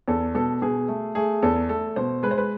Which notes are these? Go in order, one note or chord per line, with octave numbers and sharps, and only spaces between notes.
E2 A4
B2 A4
B2 G#4
A3
A3 G#4
E2 A4
A3 A4
B2 C5
G#3 B4
C5
B4